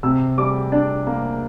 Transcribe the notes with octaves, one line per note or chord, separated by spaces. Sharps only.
C3 E6
G3 D6
D4
A#3